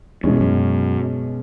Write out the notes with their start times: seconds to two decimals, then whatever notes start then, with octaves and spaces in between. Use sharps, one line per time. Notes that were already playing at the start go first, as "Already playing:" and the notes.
0.24 E2 B2 G#3 C#4
0.40 F#2